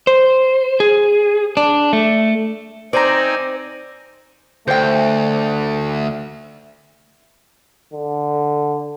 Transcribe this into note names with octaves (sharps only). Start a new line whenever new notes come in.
C5
G#4
D4
A3
C4 D#4 C5 D5 G#5 A#5
D2 A3 C5 G5
D3